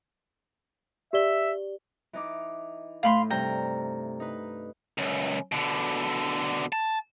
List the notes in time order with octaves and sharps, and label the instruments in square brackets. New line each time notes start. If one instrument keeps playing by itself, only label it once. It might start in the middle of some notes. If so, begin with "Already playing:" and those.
[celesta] G4 D5 G7 [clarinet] E5
[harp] E3 D#4 D6
[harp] A2 A3 [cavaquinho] F5 B5 C6
[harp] G2 C3 A4 [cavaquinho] G5 A#5
[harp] D#4 B4
[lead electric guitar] C#2 F#2
B2 D3
A5